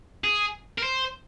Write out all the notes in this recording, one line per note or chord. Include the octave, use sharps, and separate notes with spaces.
G#4
A#4
C5